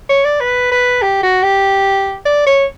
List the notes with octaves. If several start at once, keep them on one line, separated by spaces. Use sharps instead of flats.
C#5
D5
B4
B4
G4
F#4
G4
D5
C#5